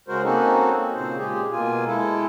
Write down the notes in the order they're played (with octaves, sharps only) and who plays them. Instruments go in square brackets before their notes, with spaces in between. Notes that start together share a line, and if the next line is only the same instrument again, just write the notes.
[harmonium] C#3 G#3 F#4 A#4 C5
A#3 C4 C#4 D#4 F#4 A4
A#2 C#3 C4 C5
A#2 G#3 G4 G#4
B2 A#3 F4 G#5
G#3 E4 A4